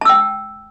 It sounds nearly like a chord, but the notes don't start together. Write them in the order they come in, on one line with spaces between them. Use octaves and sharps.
A5 E6 G5